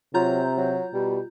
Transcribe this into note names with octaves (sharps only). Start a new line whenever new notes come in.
C3 F#3 F4 A#5 G6
F#3
B2 G3